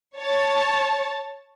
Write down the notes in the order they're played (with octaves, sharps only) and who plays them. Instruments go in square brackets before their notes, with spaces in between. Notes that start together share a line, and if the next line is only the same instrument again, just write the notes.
[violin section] C#5 A5 A6